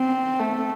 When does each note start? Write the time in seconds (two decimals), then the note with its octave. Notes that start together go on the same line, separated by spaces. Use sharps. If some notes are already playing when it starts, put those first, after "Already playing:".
Already playing: C4
0.40 A3